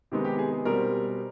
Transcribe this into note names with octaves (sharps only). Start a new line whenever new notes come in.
C3 D#3 G#3 B3 D#4
G4
G#4
G#4
B2 G3 C4 A#4